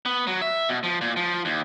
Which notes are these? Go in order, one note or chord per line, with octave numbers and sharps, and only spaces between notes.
B3
F#3
E5
B2
F3
A#2
F3
D#2